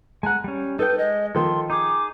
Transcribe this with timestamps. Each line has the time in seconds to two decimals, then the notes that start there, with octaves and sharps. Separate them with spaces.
0.23 G#3 F#5 G#5 A#5
0.44 G3 C#4
0.79 D#4 A4 B4 G5
0.98 G#3 D#5
1.35 D#3 F3 A4 C6
1.70 D#4 G#4 D6